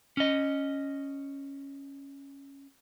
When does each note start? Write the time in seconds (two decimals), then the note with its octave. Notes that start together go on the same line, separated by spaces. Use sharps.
0.17 C#4 D#5